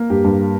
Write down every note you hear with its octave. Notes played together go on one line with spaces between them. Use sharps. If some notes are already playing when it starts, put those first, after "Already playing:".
Already playing: A#3
G2 G4
G2